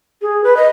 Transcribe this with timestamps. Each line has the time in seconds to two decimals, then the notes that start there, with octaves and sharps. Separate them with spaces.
0.22 G#4
0.44 B4
0.57 D#5